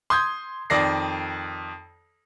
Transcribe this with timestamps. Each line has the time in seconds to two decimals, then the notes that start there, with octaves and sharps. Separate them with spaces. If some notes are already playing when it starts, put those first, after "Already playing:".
0.10 C6 D#6 G6 G#6
0.70 F2 D#3 D5 A#6 C7